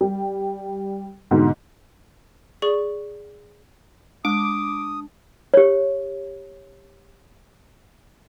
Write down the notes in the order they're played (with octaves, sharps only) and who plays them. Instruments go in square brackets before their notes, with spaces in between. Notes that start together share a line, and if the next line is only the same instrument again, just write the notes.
[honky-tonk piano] G3
G#2 B2 D3
[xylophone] G#4 D5 C#6
[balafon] G#3 [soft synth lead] D4 [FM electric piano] D6 [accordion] D#6
[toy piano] G4 C#5